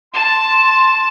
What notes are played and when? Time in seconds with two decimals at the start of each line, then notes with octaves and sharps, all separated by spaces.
0.14 A5 C6